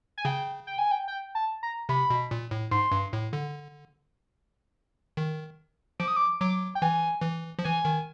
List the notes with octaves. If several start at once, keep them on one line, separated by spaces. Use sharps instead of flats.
G#5
C#3 G5
G5
G#5
G5
G5
A5
A#5
C3 B5
B2
A#2
A2
G#2 C6
G2
A2
D3
D#3
F3 D6
D#6
D6
F#3 D6
G5
E3 G#5
E3
F3
E3 G#5
D#3